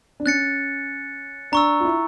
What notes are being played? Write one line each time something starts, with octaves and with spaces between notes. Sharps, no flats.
D4
C#4 F#6 A6 C#7
D4 A#5 C#6 E6
F4
E4